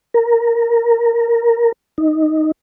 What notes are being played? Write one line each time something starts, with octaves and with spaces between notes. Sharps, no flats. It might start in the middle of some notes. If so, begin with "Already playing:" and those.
A#4
D#4